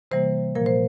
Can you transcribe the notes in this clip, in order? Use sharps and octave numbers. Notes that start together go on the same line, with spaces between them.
C3 E3 G3 A#3 C5
A#2 F3 A#3 A#4
C5